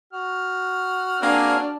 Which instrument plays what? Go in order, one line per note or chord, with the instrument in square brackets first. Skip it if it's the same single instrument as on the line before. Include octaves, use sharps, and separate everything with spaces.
[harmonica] F#4 F6
[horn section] A#3 C4 G#4 [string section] D4